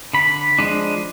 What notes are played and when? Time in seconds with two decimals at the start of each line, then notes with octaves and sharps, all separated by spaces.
0.13 D3 B5
0.59 F3 G#3 D4